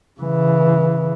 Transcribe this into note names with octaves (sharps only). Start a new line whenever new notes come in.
C#3 E3